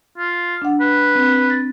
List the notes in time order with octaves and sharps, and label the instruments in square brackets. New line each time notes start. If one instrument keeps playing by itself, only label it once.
[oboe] F4
[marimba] D4 F#5
[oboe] B4
[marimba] C4
A6